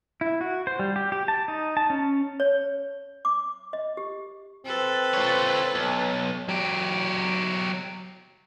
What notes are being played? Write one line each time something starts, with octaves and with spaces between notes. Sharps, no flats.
E4
F#4
C5
G3
G4
G4
A5
D#4
A5
C#4
C#5
D6
D#5
G4
C4 A4 B4
F4 C#5
B1
F#3 G4